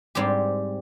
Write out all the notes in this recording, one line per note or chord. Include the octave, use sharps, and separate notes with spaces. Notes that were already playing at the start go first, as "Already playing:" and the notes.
G#2 G3 C4 G4